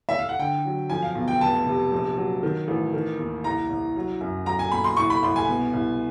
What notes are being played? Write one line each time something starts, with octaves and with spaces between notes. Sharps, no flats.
E5
F5
F#5
D3 G5
F#3
F3 G#5
F5
B1
G5
F1 A5
C3
A#1
F#3
D#3
A1
D#3
D#2
C2 A#5
C2
F#3
F#2
F#3 A#5
G#5
A#2 B5
C6
C2 C#6
B5
C2 C6
G#5
B2
C2